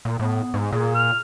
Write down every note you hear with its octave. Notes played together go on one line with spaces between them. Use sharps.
A#2
A2 B3
G#2
A#2 G#4
F6